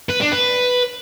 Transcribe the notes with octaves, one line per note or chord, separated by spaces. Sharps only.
B4
D4
B4